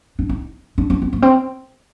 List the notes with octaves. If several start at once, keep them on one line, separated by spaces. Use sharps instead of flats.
D4
D#4
D4
D4
C4
A#3
C4